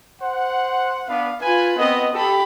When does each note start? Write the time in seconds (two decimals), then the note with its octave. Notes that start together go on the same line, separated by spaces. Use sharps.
0.21 C5 F#5
1.08 B3 D4 B4 F5
1.41 F4 B4 G#5
1.78 B3 C4 B4 D#5
2.13 G4 A4 B5